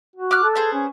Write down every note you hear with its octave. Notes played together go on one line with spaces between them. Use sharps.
F#4
D6 F6 F#6
A4
B3 G#4 C5
C#4